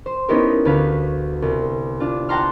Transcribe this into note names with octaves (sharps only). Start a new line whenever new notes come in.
C5
B3 C#4 D#4 E4 G4 A#4
D2 B4 F5
C2
D4 F4
F#5 G5 A5 A#5 C6 F6